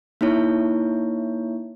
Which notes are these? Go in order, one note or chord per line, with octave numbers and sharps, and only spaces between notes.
A#3 D#4 E4 C#5